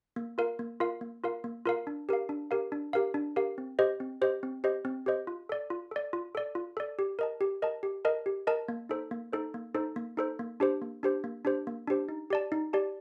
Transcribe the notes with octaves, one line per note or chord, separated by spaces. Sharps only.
A#3
F4 A#4 F5
A#3
F4 A#4 F5
A#3
F4 A#4 F5
A#3
F4 A#4 F5
D4
G4 A#4 F5
D4
G4 A#4 F5
D4
G4 A#4 F5
D4
G4 A#4 F5
C4
G4 C5 D#5
C4
G4 C5 D#5
C4
G4 C5 D#5
C4
G4 C5 D#5
F4
A4 D5
F4
A4 D5
F4
A4 D5
F4
A4 D5
G4
A#4 D#5 A5
G4
A#4 D#5 A5
G4
A#4 D#5 A5
G4
A#4 D#5 A5
A#3
D#4 A4 C5
A#3
D#4 A4 C5
A#3
D#4 A4 C5
A#3
D#4 A4 C5
A#3
D4 G4 C5
A#3
D4 G4 C5
A#3
D4 G4 C5
A#3
D4 G4 C5
D#4
G4 D5 A5
D#4
G4 D5 A5